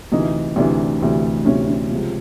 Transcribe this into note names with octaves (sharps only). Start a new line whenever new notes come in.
D2 C3 E3 D#4
D2 C3 E3 D4
D2 C3 E3
D2 C3 E3 C#4
C#4
C#2 C3 F3